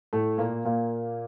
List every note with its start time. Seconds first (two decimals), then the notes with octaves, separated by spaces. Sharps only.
0.13 A2 A3
0.38 A#2 A#3
0.65 A#2 A#3